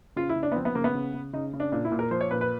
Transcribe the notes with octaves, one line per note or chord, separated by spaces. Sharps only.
C#3 F4
E4
C#3
D4
B3
F3 C4
B3
C#3 A#3
B3
C#3
C#3
C#3 D#4
C#3
D4
A#2 D4
E4
A#2
A#4
F3 C5
C#5
A#2 B4
B4